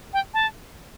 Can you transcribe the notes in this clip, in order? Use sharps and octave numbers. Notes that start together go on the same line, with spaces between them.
G5
A5